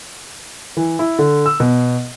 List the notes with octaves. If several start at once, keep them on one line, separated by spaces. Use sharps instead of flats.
E3
E4
D3
E6
B2